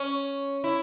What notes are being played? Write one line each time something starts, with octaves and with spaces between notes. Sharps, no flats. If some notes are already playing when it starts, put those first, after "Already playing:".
Already playing: C#4
E4